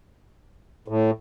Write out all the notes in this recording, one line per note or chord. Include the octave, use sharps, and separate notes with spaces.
A2